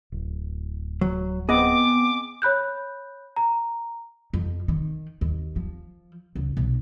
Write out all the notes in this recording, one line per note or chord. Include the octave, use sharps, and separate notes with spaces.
D1
F#3
B3 C4 G#4 D#5 D6
C#5 B5 F#6 G6
A#5
F2
D#3
D#2
F3
C#2
B1